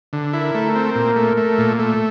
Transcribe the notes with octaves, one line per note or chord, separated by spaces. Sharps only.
D3
E4 A#4
A3
C4
A#2
A3
A3
A#2
A3